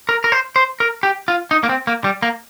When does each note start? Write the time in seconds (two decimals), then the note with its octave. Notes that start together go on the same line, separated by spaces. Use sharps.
0.09 A#4
0.24 A#4
0.32 C5
0.56 C5
0.80 A#4
1.03 G4
1.28 F4
1.51 D#4
1.63 A#3
1.69 C4
1.87 A#3
2.04 G3
2.22 A#3